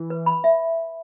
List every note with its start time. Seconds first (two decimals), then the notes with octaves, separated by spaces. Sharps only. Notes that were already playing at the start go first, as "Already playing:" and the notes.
Already playing: E3
0.10 B4
0.26 B5
0.44 E5